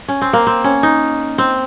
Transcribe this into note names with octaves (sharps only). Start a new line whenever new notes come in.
C#4
C4
A#3
C4
C#4
D#4
C4